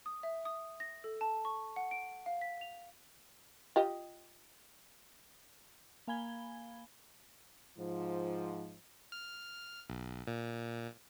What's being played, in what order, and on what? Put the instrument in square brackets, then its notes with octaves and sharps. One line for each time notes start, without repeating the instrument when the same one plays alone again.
[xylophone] D#6
E5
D#6
A#6
A4
A5
C#6
F#5
D7
F5
B6
F7
[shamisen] F4 G4 D#5
[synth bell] A#3 F5 G#5 B5 G#6 G7
[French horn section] G#2 F3
[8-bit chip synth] F6
B1
A#2